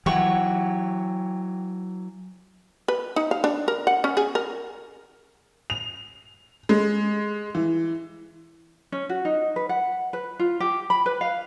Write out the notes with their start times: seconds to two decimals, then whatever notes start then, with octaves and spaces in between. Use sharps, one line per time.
0.06 E3 F#3 G4 F#5 C#6
2.88 B4
3.16 D#4
3.31 F5
3.44 D4
3.68 A#4
3.87 F#5
4.04 C#4
4.17 G#4
4.35 A#4
5.70 F7
6.69 G#3
7.55 E3
8.92 C#4
9.09 F#4
9.25 D#4
9.56 B4
9.69 F#5
10.13 B4
10.39 F4
10.60 G4
10.90 B5
11.06 B4
11.21 F5